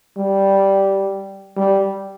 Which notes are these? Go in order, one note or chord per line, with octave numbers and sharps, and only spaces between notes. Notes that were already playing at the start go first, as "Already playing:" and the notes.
G3
G3